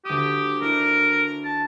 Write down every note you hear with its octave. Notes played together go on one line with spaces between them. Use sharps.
D2 G4 D#6
D4 E4 A#4
A5